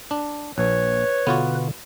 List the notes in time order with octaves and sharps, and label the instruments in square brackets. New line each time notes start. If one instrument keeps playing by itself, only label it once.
[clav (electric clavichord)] D4
[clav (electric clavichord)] A#1 [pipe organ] B4 [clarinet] C#5
[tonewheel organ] B2 D3 [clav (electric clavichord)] B3 F4 F#4